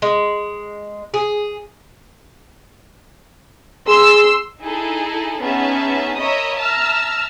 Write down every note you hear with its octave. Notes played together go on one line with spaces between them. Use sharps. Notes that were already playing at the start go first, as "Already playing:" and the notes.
G#3
G#4
G#4 C6 E6
D#4 E4 G#4 A4
B3 C#4 D#4 G#4 E5 A5
A#4 C#5 D#5 E5 B5 D#6
E5 A5 A#5 E6 F6